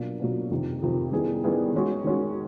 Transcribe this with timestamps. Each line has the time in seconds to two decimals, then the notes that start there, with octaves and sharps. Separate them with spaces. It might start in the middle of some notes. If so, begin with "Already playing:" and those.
Already playing: B2 F#3 A#3 D4 F4
0.20 B2 F#3 A#3 D4 F4
0.50 F2 C3 D#3
0.82 F2 C3 D#3
1.12 D#3 G3 B3 E4 G#4
1.44 D#3 G3 B3 E4 G#4
1.74 D#3 G#3 C#4 F#4
2.04 D#3 G#3 C#4 F#4